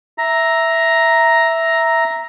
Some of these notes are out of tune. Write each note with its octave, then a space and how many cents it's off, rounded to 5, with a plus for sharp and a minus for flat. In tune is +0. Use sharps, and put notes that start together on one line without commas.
E5 +0 A#5 +5